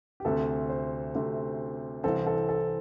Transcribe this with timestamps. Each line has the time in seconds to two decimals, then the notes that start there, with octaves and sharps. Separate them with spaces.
0.20 G4
0.25 D2 C3 A3 C4 A4
0.70 C5
1.15 D2 C3 A3 C4
2.03 C2 C3 E3 C4 A4
2.26 A4
2.49 A4